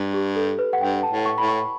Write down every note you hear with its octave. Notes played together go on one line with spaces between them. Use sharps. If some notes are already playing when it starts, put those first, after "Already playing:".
Already playing: G2
G4
A4
B4
F#5
G2 G5
A5
A2
C#6
A2 B5
C#6